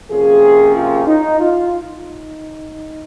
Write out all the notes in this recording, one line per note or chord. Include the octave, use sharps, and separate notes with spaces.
C3 F3 A#3 C#4 G#4
F4
D#4
F4
D#4